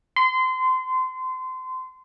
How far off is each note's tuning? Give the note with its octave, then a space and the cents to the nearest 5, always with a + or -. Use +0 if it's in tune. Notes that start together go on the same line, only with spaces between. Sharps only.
C6 -25